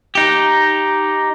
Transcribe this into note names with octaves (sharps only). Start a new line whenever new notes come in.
D#4 G4